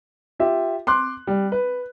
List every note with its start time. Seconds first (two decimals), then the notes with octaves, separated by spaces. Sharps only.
0.39 F4 G4 E5
0.87 C6 D6 F#6
1.27 G3
1.52 B4